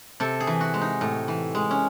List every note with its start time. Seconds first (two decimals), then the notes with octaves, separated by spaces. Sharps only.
0.20 C3 A4
0.40 G#4
0.47 E3
0.61 F#4
0.74 G#3
0.81 D#4
1.01 A2
1.28 E3
1.55 G#3
1.71 C#4